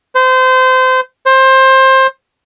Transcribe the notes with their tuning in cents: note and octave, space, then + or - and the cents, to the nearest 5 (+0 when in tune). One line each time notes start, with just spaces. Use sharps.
C5 -25
C5 +20